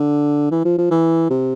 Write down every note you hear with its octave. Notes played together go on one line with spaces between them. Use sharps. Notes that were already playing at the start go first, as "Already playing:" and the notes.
Already playing: D3
E3
F3
F3
E3
C3